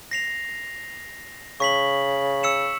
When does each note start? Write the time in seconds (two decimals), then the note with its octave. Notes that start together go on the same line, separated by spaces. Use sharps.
0.11 A#6 C7 F7
1.60 C#3 C#6 B6 F#7
2.43 E6 C#7 E7